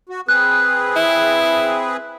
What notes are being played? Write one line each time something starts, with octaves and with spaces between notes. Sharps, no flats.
F#4
C4 G#4 B4 F#6
E4